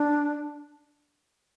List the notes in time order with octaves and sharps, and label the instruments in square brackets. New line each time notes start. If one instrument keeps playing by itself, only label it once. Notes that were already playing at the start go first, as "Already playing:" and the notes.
Already playing: [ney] D4